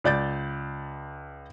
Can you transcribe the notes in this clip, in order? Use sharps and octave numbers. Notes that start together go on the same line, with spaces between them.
C#2 D5 G6 A6